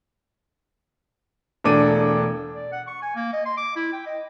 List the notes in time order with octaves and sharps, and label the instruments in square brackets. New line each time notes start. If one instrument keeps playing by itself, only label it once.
[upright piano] E1 A3 D4 D6 D#7
[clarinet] D5
F#5
C#6
G#5
A#3
D#5
C6
D6
E4
G5
D#5